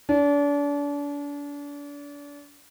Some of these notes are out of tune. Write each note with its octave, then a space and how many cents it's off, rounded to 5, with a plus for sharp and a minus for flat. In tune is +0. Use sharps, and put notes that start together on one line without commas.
D4 -35